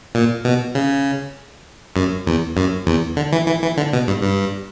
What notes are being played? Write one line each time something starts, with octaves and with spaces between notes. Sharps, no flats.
A#2
B2
C#3
F#2
E2
F#2
E2
D3
E3
E3
E3
D3
B2
G2
G2